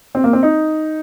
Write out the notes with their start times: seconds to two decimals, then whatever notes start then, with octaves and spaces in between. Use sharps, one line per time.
0.15 C4
0.24 A#3
0.33 C4
0.43 D#4